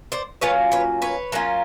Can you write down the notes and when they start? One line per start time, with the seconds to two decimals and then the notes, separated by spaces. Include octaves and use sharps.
0.12 C5 D5
0.41 F#3 A#3 C#4 F4 B4 C#5
0.72 B4 C#5
1.02 B4 C#5
1.32 F#3 A#3 C#4 F4